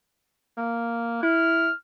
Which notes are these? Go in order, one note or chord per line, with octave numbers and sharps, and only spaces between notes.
A#3
E4 F6